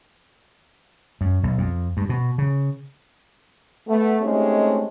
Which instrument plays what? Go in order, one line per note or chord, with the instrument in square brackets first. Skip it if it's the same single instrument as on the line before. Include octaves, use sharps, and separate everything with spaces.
[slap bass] F#2
B1
F2
G2
B2
C#3
[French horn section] A3 B3
G#3 A3 C4 C#4 D#4 G4